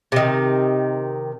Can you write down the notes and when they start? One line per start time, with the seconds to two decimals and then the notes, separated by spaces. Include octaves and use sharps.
0.12 C3 D#3